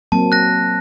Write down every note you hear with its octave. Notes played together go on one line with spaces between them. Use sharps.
F#3 A#3 C4 A5
F#6 A#6